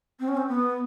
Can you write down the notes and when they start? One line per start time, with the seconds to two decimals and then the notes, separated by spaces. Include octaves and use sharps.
0.20 C4
0.28 C#4
0.37 C4
0.48 B3